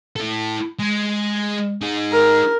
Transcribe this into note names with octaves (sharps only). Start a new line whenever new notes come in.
E4 A4
G#3
D#4 G#4
A#4